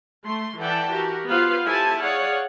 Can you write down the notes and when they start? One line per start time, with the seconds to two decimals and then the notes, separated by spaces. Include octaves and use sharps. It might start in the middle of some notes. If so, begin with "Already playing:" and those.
0.24 A3 C6
0.59 E3 A4 D5 F#5 G5 A5
0.93 F#4 G4 A#4
1.28 B3 F4 B4 C5 F5
1.65 E4 G4 A4 C5 G#5 A5
2.01 G#4 C#5 D5 F5 F#5